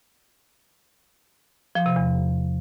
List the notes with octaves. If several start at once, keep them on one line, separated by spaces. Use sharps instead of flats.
F3
C3
E2